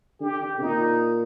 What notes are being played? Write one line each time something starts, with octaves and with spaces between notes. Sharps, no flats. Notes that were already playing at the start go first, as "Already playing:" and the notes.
D3 G4
D3
C3
A#2 D#4